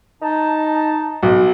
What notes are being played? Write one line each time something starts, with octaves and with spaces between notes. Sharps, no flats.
D#4 A5
B1